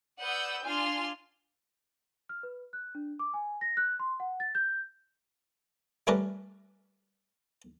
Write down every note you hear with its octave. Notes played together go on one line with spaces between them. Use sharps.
B4 D5 F#5 D#6 E6 G6
D4 F4 G#5 C6 F6
F6
B4
F#6
D4
D6
G#5
A#6
F#6
C6
F#5
A6
G6
G3 A3 C#4 A#4 B4 D5